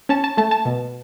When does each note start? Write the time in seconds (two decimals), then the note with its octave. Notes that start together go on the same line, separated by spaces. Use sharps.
0.09 C#4 A5
0.24 A5
0.37 A3 A5
0.51 A5
0.65 B2